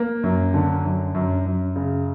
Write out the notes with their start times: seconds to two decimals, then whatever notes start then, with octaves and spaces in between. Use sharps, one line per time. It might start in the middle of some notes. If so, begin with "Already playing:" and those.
Already playing: A#3
0.23 F#2
0.54 D3
0.85 F#2
1.15 F#2
1.46 F#2
1.76 C#3